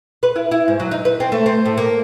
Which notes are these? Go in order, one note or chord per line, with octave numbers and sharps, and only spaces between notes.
B4
E4
E4
G#2
F#3
D#4
B4
C4
A3
C4
A2
A#3